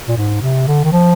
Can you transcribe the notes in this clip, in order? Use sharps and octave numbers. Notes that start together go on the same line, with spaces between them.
A#2
G#2
C3
D3
D#3
F3